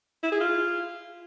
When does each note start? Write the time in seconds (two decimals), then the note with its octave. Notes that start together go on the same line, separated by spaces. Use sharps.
0.23 E4
0.32 G#4
0.40 F4